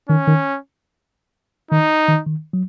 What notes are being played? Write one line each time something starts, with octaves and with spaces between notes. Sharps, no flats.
D#3 C#4
D#3
D#3 D#4
D#3
D#3
F#3